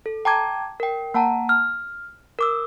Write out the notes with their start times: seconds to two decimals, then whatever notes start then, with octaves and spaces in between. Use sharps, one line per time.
0.06 A4
0.25 G5 A5 A#5 D6 G#6
0.80 A#4 G5
1.14 A#3 F#5 A5 A#5
1.49 F6
2.39 A#4 D6 E6